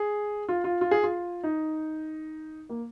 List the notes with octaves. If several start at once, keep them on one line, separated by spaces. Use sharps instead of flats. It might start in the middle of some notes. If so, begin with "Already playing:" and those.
Already playing: G#4
F4
F4
F4
G#4
F4
D#4
A#3